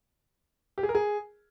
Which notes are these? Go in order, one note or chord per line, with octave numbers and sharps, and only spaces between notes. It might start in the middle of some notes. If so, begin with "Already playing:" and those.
G4
G#4
A#4
G#4